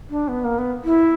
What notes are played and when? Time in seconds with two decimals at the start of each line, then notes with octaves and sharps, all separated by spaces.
0.09 D4
0.28 B3
0.44 A#3
0.58 B3
0.84 E4